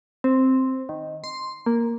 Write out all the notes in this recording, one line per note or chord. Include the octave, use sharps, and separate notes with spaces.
C4
D#3
C6
A#3